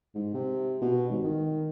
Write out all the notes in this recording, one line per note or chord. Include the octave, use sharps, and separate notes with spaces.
G#2
C3
B2
G#1
D#3